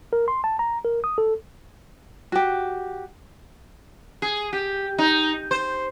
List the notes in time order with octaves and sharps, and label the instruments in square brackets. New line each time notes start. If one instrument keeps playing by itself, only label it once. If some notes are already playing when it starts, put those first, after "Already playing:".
[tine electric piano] A#4
C6
A5
A#5
A#4
D#6
A4
[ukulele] F#4 G4
[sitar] G#4
G4
D#4
C5